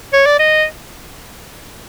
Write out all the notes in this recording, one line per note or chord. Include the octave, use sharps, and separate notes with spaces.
C#5
D5
D#5